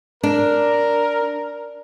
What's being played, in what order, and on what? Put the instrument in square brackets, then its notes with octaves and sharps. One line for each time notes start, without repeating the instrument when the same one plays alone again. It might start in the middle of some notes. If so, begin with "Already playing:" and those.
[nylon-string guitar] D4 [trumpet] A#4